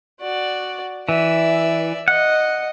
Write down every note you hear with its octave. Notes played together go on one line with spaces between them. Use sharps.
F#4 D5
E3 D5 E5
D#5 F#5